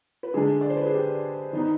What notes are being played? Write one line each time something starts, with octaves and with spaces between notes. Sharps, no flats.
B4
D3 G#3 D4 G#4
D5
C5
B4
G#4
G4
D#3 B3 D#4